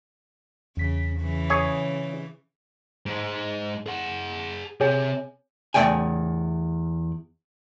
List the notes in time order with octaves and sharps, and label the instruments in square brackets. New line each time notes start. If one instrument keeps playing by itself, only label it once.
[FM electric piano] E2 B6 [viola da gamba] C#3
[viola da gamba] C#3 E3
[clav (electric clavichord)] G#4 C#5 G#5
[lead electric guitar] G#2 G#3
G#4 F#5
[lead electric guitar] C3 [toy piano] G#4 C#5 G#5
[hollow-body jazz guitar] E2 G#2 A3 D5 G5 G#5